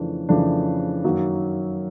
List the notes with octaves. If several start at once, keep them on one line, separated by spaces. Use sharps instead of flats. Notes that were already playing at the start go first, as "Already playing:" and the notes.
Already playing: F2 C#3 E3 A3 D4
F2 C#3 E3 A3 D4
F#2 D#3 F#3 A#3